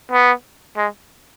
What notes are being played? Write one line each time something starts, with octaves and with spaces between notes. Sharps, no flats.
B3
G#3